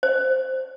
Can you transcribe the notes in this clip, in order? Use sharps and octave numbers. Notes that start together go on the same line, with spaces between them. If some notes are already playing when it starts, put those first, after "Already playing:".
C5